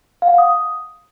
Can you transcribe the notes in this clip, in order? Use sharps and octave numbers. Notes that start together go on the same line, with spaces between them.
F5
F#5
F5
D#6